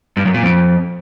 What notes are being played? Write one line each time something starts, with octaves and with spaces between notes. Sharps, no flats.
G2
F#2
A#2
F2